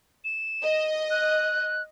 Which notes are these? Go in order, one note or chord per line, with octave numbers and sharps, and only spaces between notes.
E7
D#5
F#6